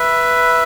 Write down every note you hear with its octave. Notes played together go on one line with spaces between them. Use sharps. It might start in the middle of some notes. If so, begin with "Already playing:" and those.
Already playing: B4 E5